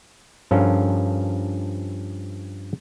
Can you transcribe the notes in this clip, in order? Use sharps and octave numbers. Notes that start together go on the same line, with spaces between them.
G2 F3 C#4 F4 A4 A#4